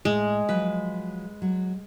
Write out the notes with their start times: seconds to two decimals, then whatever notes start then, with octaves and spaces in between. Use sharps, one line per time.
0.05 A2 G#3
0.49 F3 F#3 B4
1.42 F#3